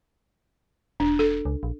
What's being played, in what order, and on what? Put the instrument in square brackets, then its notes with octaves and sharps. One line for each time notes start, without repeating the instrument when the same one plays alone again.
[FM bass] E1 [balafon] D4
[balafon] A4
[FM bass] C#2
A#1